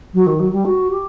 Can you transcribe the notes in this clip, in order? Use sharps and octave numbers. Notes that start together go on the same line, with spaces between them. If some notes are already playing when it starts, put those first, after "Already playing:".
F#3
D#3
F#3
G3
F#4
G4